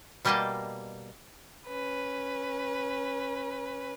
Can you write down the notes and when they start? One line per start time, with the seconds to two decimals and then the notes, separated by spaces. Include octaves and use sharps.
0.25 B2 G3 A#3 D#5 G5 A5
1.67 C#4 B4